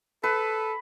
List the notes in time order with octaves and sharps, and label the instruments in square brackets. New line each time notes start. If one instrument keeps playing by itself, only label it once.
[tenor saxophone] A4 [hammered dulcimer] B4